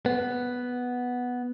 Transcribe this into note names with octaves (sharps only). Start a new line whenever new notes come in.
B3